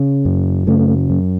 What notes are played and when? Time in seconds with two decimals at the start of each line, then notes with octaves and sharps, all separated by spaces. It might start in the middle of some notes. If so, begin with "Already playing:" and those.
Already playing: C#3
0.25 F#2
0.67 C#3 A3
1.10 F#2